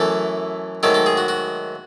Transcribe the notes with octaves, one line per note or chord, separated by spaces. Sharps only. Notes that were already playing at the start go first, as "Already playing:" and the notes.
Already playing: F#2 E3 A3 A4
G#2 D#3 F#3 A3 A4
A4
G#4
F#4
F#4